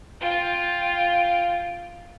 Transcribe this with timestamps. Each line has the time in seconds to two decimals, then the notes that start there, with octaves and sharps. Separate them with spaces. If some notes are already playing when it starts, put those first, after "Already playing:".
0.21 F4 G5